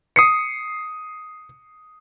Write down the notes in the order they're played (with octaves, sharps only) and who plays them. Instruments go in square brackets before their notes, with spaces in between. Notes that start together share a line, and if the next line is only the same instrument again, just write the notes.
[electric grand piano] D#6 C7 C#7